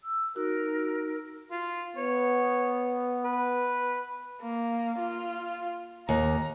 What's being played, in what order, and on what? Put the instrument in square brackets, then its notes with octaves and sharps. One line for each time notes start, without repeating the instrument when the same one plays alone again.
[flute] E6
[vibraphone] D#4 F#4 E6 [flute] A#4
[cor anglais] F4
[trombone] B3 [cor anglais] C#5
[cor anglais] B4
[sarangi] A#3
F4
[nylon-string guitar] D#2 [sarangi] A#5